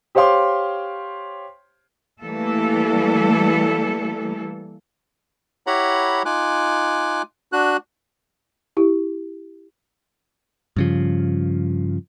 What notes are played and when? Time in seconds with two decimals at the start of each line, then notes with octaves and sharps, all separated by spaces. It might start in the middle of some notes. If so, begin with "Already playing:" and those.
0.15 G4 C5 C#5 F5 C6 D6
2.22 E3 G3 A3 A#3 A4
5.67 E4 G4 C#5 F#5 A#5 B5
6.25 D#4 F4 G#5 D6 F#6
7.52 D4 F#4 F#6
8.77 E4 G4
10.76 G2 C#3 F3